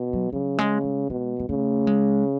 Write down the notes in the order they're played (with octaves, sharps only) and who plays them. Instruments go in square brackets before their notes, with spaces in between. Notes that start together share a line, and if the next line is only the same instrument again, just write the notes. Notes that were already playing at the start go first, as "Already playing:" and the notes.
Already playing: [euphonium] B2
[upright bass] F#3
[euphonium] C#3 [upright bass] F#3
[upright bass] G#3
G#3
[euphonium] B2 [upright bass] G#3
[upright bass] G#3
[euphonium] C#3 [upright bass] A3
[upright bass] G#3